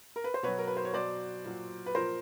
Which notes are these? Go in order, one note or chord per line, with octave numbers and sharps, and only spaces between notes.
A#4
B4
C5
B2 F#3 B4 C#5
A#4
B4
C5
C#5
B2 F#3 C5 D5
A#2 F#3
B4
A#2 F3 A#4 C5